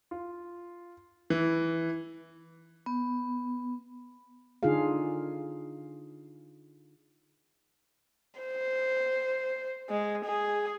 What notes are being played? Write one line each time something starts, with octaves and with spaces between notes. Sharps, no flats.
F4
E3
B3
D3 D4 D#4 F4 G#4 F5
C5
G#3
G#4